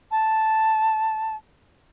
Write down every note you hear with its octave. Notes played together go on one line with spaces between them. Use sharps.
A5